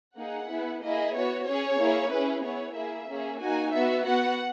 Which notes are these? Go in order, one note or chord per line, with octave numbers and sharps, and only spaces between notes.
A#3 D#4 G#4 F#5
B3 E4 G#4
A#3 E4 G#4 D#5
B3 F#4 C#5
C#4 G#4 C#5
A#3 E4 G#4
C#4 E4 G#4 B4
B3 E4 G#4 C#5
A#3 E4 G#4 E5
A#3 C#4 G#4
A#3 D#4 F#4 G#5
B3 F#4 E5
B3 F#4 F#5